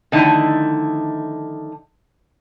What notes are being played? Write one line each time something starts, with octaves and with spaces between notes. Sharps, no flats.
D3 D#3 F3 A3 D#4 E4